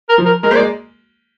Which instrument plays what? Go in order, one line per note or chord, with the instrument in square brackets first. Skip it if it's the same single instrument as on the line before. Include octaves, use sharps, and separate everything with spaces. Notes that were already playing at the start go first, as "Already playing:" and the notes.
[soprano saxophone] A#4
[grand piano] F3
[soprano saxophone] A#4
[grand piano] G#3 [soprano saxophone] A#4
[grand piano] A#3 [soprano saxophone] C5
[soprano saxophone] D5
[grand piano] G#3